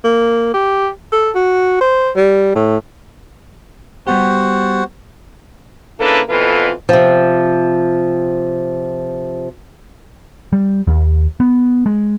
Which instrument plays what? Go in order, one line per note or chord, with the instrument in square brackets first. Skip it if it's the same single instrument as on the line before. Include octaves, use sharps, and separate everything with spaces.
[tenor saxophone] A#3
G4
A4
F#4
C5
G3
A2
[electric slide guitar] G3 B3 G4 [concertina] F#4 C5 F#5
[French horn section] C#3 A#3 D4 E4 A4 B4
F2 B2 E3 F4 A4 B4
[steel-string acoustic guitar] C3 F3
[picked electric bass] G3
D#2
B3
G#3